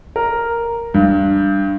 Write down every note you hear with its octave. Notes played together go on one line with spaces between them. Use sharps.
A#4
G2